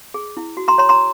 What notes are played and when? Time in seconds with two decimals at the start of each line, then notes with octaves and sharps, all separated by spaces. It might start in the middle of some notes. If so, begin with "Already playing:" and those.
0.14 G#4
0.37 E4
0.57 F#4
0.68 A#5 C6
0.78 C#5 A#5 C6
0.89 A#5 C6